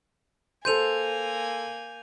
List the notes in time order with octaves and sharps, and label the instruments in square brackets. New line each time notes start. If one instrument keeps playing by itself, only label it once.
[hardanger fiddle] A#3 G#5 [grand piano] A4 C5 C6 [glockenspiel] G6 D#7 F7